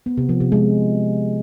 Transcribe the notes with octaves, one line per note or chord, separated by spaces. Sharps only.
B3
C3
F3
C3
G#3